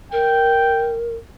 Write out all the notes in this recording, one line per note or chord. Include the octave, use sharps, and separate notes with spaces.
A#4 G5